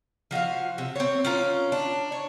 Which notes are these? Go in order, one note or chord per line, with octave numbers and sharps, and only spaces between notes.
F3 F#4 E5 F5
C3
C4 C#5
C#4 F4 A#4
D4
C#5